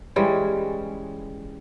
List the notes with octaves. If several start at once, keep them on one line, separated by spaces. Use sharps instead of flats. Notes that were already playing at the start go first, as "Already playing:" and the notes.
E3 G3 G#3 C#4